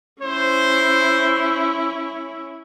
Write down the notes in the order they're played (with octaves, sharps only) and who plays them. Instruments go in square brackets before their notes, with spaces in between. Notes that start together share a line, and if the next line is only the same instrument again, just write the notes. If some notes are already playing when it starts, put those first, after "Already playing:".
[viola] C#4 E4 [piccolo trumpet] C5